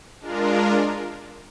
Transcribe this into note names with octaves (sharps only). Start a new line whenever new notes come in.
G#3 D4 F4 A#4